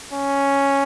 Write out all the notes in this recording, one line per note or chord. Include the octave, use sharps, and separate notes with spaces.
C#4